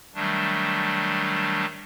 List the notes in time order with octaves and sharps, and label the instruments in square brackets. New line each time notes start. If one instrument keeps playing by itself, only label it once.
[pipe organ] D#3 F#3 G3 A3 D4